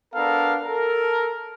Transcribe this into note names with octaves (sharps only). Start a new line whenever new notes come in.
B3 D4 A4 A#4 F5
A4 A#4